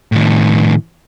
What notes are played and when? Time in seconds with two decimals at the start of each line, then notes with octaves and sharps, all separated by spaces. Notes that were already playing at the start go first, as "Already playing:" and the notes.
0.12 A2 D#3